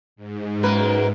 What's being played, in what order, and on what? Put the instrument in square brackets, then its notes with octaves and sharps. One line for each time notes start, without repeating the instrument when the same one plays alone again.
[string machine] G#2
[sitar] F#2 A#3 B4